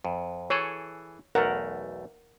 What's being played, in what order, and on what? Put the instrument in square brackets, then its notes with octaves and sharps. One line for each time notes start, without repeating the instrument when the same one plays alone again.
[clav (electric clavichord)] F2
[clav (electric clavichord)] E3 G#4 A4 [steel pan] C#5
[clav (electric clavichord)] B1 E2 A3 [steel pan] A#4 F#5